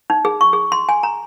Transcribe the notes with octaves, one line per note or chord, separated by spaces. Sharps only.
D#4
G#4
C#6
G#4
C6
G#5
A#5